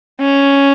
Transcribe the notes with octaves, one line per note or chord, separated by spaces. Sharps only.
C#4